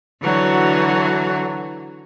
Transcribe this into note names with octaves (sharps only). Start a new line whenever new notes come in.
D3 E3 F#3 F#4